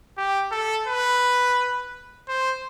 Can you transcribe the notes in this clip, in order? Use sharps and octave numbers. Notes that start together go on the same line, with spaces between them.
G4
A4
B4
C5